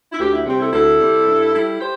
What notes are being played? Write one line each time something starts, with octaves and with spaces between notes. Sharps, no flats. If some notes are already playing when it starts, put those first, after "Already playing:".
E4
D2 G4
E4
C3 G3 C4 G4
E4 A4
D2 E4 A4
C3 G3 C4
G2
G3 E4
G4 C5